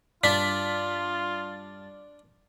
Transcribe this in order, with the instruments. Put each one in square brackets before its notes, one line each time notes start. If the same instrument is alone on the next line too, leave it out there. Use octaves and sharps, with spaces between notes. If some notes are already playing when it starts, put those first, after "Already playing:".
[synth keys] G2 A5 A6 [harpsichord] D4 [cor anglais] F4 [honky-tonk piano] B6